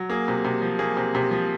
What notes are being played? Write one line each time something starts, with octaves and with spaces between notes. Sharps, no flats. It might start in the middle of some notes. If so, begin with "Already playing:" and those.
Already playing: F#3
A#3 G#4
C3
C3
F3
A#3 G#4
C3
C3
F3